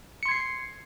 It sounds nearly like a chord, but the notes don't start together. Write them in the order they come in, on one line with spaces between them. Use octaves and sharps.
C#7 C6 G#6 C7